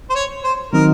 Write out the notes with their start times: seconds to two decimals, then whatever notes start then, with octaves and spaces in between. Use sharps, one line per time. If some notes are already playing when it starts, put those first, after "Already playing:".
0.10 C5
0.15 C#5
0.44 C5
0.73 D#3 F#3 C4 D#4 A#4